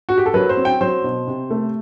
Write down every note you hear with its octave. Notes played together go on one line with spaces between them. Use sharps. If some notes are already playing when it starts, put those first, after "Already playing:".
F#4
G4
A4
F#3 B4
C5
C4
G5
F#3 C5
B2
C3
A3